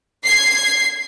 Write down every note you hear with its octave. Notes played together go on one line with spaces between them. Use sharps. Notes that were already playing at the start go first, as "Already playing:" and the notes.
G#6 C7